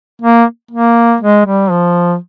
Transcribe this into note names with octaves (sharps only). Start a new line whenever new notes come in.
A#3
A#3
G#3
G3
F3